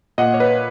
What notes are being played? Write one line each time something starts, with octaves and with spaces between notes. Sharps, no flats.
A#2 D#5 F#5
C#5
B4 D#5